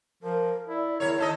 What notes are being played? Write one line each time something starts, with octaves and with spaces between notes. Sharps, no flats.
F3 A#4
E4 D5
E2 F#3 E4 A#4 C#5
D#2 D#4 A4 D#5